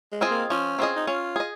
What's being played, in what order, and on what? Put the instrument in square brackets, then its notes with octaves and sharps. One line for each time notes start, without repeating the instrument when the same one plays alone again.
[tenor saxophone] G#3
[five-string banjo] C4 F4 G#4 D#5
[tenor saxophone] A#3
[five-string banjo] F3 [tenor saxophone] C#4
[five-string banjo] C4 F4 G#4 D#5
[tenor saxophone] D#4
[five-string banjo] C#4 [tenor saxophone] F4
[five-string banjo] G#4 D#5